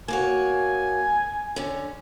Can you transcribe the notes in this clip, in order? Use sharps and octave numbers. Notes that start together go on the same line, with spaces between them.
A#3 F#4 C#5 G#5
D3 C#4